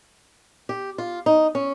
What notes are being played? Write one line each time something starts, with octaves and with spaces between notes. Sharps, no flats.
G4
F4
D#4
C#4